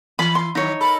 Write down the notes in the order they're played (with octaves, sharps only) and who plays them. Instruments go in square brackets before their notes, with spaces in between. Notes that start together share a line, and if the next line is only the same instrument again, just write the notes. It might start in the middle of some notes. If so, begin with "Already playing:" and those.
[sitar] E3 [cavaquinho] B5
[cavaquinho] C6
[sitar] D#3 F#3 [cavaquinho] D#4 C#5
[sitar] A4 A#4 [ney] B5